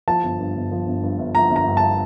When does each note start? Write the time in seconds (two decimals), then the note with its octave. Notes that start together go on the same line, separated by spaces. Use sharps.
0.08 F3 A5
0.24 G1
0.40 G2
0.55 G1
0.71 F3
0.87 G1
1.03 G2
1.19 G1
1.35 F3 A#5
1.50 G1
1.56 A#5
1.66 G2
1.77 A5